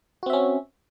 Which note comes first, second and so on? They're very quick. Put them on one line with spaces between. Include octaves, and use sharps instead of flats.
F#4 C4 E5 C#4